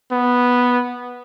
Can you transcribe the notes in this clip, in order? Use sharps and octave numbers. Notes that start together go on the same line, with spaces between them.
B3